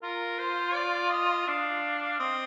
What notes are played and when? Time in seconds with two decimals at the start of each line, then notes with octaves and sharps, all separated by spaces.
0.03 F4 A#4
0.39 C5
0.75 D5
1.11 D#5
1.47 D4 F5
2.19 C4 D#5